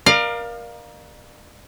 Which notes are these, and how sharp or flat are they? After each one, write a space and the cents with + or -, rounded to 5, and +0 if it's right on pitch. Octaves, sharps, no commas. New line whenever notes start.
A#4 +20 D5 +35 F5 +5